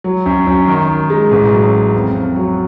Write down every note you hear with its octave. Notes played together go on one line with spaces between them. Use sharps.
F#3
F#2
F#2
D#3
D#3
G#3
A1
F#3
F#3
F2
F2
F#3